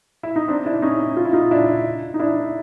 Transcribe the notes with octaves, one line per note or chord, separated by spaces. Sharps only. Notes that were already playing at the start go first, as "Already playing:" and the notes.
E4
D#4
C4 D4
D4 E4
C#4 D#4
F4
E4
D#4 F4
D4 E4
D#4
D4 E4